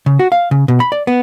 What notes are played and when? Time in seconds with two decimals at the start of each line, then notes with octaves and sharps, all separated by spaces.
0.06 C#3
0.19 F#4
0.32 F5
0.51 C#3
0.68 B2
0.80 B5
0.92 D5
1.07 B3